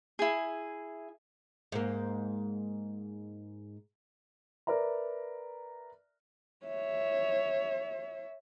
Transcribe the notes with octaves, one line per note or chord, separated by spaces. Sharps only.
E4 G#4
G#2 A#3
A#4 B4 D5 E5 A#5
C#5 E5